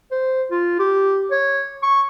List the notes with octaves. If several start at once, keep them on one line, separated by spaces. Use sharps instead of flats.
C5
F4
G4
C#5
C#6